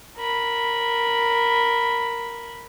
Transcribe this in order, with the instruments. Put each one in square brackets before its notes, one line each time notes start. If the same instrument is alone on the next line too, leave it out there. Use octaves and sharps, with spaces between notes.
[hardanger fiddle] A#4 B5